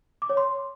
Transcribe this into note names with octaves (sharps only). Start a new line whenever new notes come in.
D6
C#5
C6